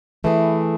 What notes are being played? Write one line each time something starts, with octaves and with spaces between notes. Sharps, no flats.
E3 A3 E4 G#4